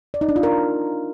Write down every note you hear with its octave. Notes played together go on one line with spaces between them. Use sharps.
D5
D#4
D4
F4
A#4